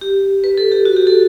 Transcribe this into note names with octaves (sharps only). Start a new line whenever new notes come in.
G4
B4
A4
G4
F#4
G4
A4